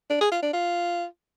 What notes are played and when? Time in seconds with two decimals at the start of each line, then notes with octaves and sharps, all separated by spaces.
0.10 D4
0.21 G#4
0.32 F4
0.43 D4
0.53 F4